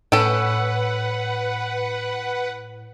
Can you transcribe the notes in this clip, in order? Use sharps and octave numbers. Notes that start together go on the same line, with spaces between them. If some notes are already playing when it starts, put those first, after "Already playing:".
A2 C#4 A4 B4 F#5 G5